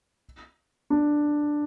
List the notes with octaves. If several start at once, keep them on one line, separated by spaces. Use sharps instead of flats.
D4